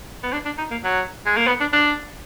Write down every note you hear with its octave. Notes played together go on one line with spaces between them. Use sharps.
B3
D4
D4
D#4
A#3
F#3
G#3
A#3
B3
D4
D4